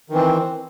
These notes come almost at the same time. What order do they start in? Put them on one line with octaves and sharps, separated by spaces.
D#3 E3 C4